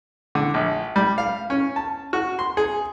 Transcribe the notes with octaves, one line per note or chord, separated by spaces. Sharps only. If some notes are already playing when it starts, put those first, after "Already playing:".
D3
A#1
G3
F5
C#4
A5
F#4
C6
G#4